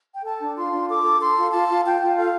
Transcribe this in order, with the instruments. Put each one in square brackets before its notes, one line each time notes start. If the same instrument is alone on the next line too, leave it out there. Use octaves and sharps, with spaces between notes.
[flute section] G5
A4 A5
D4
F4 C6
D4
A4 D6
A4
A4 C6
F4
F4 A5
F4
F4 G5
F4
A4 F5